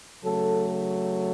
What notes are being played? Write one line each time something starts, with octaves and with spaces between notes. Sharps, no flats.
C#3 F#3 A3 A4